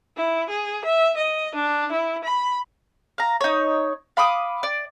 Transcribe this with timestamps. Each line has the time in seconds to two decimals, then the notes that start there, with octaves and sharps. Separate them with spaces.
0.17 E4
0.50 G#4
0.85 E5
1.17 D#5
1.55 D4
1.93 E4
2.24 B5
3.18 F5 A#5
3.41 D#4 C#5
4.17 F5 B5 D6 D#6
4.63 D5